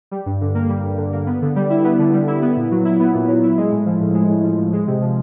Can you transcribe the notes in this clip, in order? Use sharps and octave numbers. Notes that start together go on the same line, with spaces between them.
G3
G2
D3
A#3
G3
G2
D3
A#3
B3
D3
G3
E4
B3
D3
G3
E4
B3
A#2
F#3
E4
B3
A#2
F#3
E4
G#3
A2
F3
A2
G#3
A2
F3
A2
G#3
C3
F3